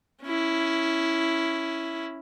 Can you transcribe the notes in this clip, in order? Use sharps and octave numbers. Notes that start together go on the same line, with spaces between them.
C#4 E4